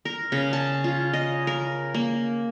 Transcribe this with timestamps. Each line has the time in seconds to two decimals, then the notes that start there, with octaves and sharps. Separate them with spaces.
0.05 A#4
0.32 C#3
0.53 A5
0.84 F4
1.13 D#5
1.47 A#4
1.94 A#3